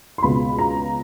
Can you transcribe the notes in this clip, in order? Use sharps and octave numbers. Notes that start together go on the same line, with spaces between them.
C6
C#2 B2 G#3 B3 B5
A#5